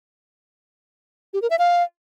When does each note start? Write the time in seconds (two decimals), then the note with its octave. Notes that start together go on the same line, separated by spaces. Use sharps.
1.34 G4
1.42 A#4
1.50 E5
1.59 F5